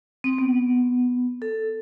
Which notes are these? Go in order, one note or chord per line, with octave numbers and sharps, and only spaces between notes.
C4
B3
A4